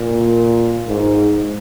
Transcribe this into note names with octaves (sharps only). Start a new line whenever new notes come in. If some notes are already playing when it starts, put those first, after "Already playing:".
Already playing: A#2
G#2